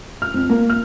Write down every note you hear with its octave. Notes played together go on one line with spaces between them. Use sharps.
F6
F2
A#3
F6